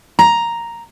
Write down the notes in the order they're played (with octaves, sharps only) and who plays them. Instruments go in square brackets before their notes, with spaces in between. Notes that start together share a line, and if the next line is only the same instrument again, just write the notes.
[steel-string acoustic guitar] A#5